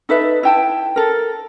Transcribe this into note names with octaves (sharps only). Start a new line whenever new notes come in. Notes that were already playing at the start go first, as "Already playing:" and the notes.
D#4 A4 B4 E5
E4 G5 A5
A4 A#4